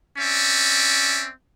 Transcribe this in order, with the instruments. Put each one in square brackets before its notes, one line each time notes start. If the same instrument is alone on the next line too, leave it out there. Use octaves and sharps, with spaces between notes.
[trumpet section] C4 C#4 D5 E5